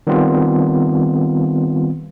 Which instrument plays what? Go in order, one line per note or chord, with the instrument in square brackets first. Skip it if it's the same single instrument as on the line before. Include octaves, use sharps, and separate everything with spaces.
[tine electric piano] D#3 G3 B3 C4 F4